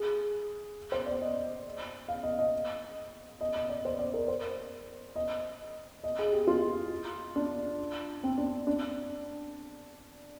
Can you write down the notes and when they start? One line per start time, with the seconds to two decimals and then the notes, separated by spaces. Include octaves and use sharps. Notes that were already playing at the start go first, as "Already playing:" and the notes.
Already playing: G#4
0.92 C5
1.06 D5
1.21 D#5
2.08 F5
2.23 D#5
2.39 D#5
3.41 D#5
3.55 D#5
3.69 D5
3.85 C5
3.99 D5
4.14 A#4
4.28 C5
5.16 D#5
6.04 D#5
6.19 G#4
6.32 G4
6.47 F4
7.36 D4
8.24 C4
8.38 D4
8.67 D4